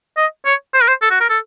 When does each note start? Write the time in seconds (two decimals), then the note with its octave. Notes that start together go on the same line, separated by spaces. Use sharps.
0.17 D#5
0.46 C#5
0.74 C5
0.82 A#4
0.88 C5
1.02 A4
1.11 F#4
1.21 A#4
1.30 A4